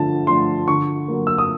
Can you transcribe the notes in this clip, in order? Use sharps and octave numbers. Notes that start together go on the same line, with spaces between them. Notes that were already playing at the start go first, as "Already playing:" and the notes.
Already playing: D3 F3 A3 D4 A5
F3 A3 D4 C6
D3 C#6
F#3 A#3
E6
D#6